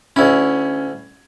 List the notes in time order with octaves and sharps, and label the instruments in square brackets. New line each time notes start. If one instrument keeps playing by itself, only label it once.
[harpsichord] D2 E4 [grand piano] C#4